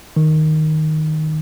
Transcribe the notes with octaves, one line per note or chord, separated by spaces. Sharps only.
D#3